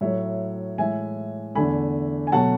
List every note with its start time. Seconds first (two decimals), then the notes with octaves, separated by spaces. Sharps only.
0.01 A2 F#3 A3 C#5 E5
0.78 A2 E3 G#3 E5 G#5
1.55 E2 D3 A3 G#5 B5
2.27 G#5
2.32 B2 F#3 A3 F#5 A5